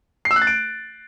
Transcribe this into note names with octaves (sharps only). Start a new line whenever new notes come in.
C7
E6
F#6
A6
D7